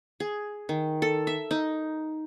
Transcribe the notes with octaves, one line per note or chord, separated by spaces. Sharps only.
G#4
D#3
A4
E5
D#4